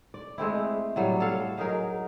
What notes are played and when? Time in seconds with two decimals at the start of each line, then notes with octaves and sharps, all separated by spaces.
0.14 D5
0.38 G#3 A3 C4 E4
0.96 A2 F#3 G3
1.20 A4 C#5 F5
1.58 F#3 D#4 G#4 A#4